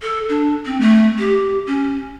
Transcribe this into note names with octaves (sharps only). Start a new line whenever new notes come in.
A4
D4
C4
A3
G4
C#4